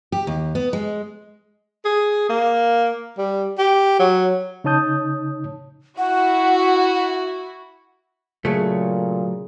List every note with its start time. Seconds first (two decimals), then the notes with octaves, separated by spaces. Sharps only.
0.12 G4
0.27 D#2
0.55 B3
0.73 G#3
1.85 G#4
2.29 A#3
3.18 G3
3.58 G4
3.99 F#3
4.64 C#3 D#4 C#5 A5 D#6 G6
5.98 E4 F#4 F#5
8.45 A#2 C#3 F#3 A3 G#4